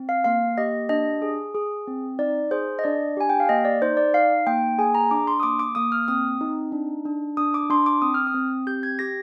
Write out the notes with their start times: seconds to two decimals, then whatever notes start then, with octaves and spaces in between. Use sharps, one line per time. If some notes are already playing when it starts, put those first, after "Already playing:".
Already playing: C4
0.09 F5
0.25 A#3 F5
0.58 G4 D#5
0.89 D4 D#5
1.22 G#4
1.55 G#4
1.88 C4
2.19 D#4 D5
2.51 G#4 C5
2.79 D#5
2.84 D4 D5
3.17 G4 G#5
3.29 G5
3.40 F5
3.49 A#3 D#5
3.65 D5
3.82 D#4 C5
3.97 D5
4.14 D#4 F5
4.47 A#3 G5
4.79 G#4 G#5
4.95 A#5
5.11 D4 D6
5.27 C6
5.40 D#6
5.43 A#3 D6
5.59 D6
5.75 A#3 D#6
5.92 F6
6.08 C4 D#6
6.41 D#4
6.72 D4
7.05 D4
7.37 D4 D#6
7.54 D6
7.70 D4 C6
7.86 D6
8.02 C4 D#6
8.14 F6
8.27 D#6
8.34 C4
8.67 G4 G6
8.83 G#6
8.99 G4 A#6